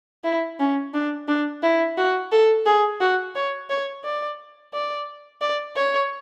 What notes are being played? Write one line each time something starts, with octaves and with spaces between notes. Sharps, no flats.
E4
C#4
D4
D4
E4
F#4
A4
G#4
F#4
C#5
C#5
D5
D5
D5
C#5